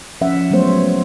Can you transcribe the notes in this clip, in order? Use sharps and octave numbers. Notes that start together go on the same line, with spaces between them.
F3 C#4 E5 F#5
F#3 G#3 A3 B3 C5 C#5